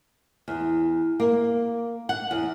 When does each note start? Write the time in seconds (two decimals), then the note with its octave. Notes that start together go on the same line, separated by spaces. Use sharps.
0.48 E2
1.20 A#3
2.09 F#5
2.31 E2